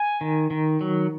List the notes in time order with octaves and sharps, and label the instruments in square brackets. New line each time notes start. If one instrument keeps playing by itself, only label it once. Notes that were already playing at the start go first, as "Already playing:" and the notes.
Already playing: [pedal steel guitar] G#5
D#3
D#3
F#3